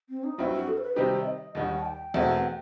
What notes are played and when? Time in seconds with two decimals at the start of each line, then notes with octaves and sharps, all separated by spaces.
0.09 C4
0.23 D#4
0.38 G2 F#3 C4 E4 F#4
0.52 F#4
0.67 A4
0.77 C5
0.82 B4
0.96 C3 D#3 G3 D#4 G4 C5
1.20 E5
1.26 D#5
1.55 D#2 D#3 G3 D#4 F#5
1.78 A5
1.85 G5
2.14 E2 B2 A3 C4 E4 F#5
2.36 F#5
2.44 G5